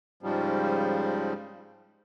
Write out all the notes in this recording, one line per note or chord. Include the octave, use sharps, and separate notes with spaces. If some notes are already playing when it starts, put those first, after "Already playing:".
G#2 C#3 F3 G3